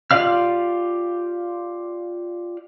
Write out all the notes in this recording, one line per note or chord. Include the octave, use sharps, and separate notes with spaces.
F4 G4 D5 F5 F6